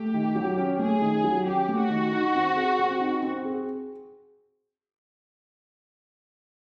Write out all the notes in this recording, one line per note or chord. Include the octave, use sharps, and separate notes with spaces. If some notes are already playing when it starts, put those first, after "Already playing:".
Already playing: A3 G4
D#3
F#3
C#4
A3 G#4
D#3
F#3
C#4 G4
A3
F#4
D#3
D#4
C4
G#4
C4
D#4
C4
G#4